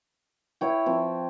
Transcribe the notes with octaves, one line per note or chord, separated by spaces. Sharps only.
E4 C#5 G5
F3 C4